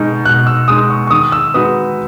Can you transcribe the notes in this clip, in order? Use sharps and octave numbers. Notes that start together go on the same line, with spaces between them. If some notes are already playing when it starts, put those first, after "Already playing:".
Already playing: B2 G#3 D#4
B2 F#6
E6
G#3 D#4 D#6
C#6
C#6
D#3 D#6
E6
G#3 D#4 F#4 B4 D#6